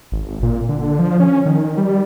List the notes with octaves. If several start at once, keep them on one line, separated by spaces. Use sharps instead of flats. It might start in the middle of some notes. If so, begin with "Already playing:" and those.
G#1
A#2
D3
F3
C#4
D#3
G3